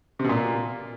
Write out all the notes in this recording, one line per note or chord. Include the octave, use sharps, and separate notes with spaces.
C3
B2
A#2